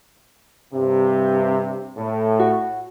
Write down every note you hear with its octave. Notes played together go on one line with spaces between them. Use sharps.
G2 C3
A2
F#4